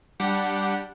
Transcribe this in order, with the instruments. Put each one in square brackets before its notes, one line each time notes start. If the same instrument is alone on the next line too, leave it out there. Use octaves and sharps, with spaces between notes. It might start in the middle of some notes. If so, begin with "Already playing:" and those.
[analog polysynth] G3 D4 G4 F#5